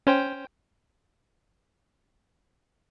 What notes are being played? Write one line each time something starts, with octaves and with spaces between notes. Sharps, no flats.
C#4 C5 G5